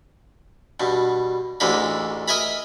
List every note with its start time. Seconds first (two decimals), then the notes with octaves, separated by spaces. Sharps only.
0.80 G2 B2
1.60 A1 D2 D3 G#3 A#3 B5
2.28 A#4 D#5 E5 G#5 A#5 B5